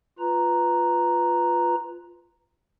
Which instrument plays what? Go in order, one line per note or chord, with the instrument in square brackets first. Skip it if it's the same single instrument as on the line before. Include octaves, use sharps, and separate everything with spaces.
[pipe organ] F4 B4 A#5